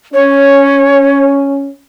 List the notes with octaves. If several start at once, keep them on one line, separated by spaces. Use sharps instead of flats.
C#4 C#5